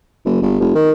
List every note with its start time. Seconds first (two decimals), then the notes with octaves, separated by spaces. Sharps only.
0.25 F#1
0.42 G1
0.60 F1
0.75 D#3